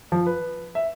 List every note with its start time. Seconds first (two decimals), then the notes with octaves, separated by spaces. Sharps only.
0.12 F3
0.26 B4
0.75 E5